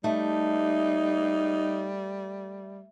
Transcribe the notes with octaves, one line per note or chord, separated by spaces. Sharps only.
G3 A3 D#4